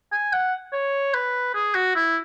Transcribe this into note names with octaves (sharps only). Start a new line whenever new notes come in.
G#5
F#5
C#5
B4
G#4
F#4
E4